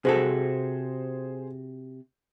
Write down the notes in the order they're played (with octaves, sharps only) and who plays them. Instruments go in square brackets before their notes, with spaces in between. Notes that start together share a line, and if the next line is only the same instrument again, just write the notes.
[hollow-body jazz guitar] C3 F#4 A4 [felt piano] G#4 C5